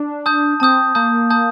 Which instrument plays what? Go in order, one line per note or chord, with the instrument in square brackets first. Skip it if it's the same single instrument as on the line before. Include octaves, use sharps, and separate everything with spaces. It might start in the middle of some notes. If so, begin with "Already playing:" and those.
Already playing: [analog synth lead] D4
[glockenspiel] A5 D#6 G6
[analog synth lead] C4 [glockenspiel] A5 D#6 G6
[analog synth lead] A#3 [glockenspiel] A5 D#6 G6
[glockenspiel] A5 D#6 G6